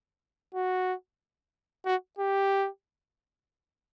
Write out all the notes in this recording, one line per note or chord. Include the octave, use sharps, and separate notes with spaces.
F#4
F#4
G4